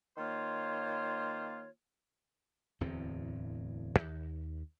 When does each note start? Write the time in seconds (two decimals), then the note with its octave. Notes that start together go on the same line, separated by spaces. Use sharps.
0.17 D#3 A#3 F4 C5 C#5
2.81 D1 E2 A2 C4
3.99 D#2